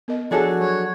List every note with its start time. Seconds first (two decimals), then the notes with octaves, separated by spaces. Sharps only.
0.08 B3 A#4 D#5
0.31 F3 D4 F#4 G#4 A4 C#5 A5
0.60 F#3 C#5